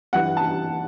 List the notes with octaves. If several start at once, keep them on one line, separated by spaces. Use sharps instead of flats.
G2 E3 F#5
A5